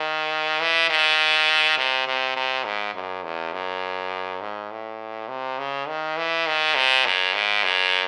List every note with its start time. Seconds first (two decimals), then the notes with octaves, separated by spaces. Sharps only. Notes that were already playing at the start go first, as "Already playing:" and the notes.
Already playing: D#3
0.61 E3
0.90 D#3
1.78 C3
2.07 C3
2.36 C3
2.65 G#2
2.94 F#2
3.24 E2
3.53 F#2
4.41 G#2
4.71 A2
5.29 C3
5.58 C#3
5.88 D#3
6.17 E3
6.47 D#3
6.75 C3
7.05 F#2
7.34 G#2
7.63 F#2